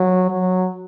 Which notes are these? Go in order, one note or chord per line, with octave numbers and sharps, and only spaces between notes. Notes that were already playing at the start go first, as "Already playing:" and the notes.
Already playing: F#3
F#3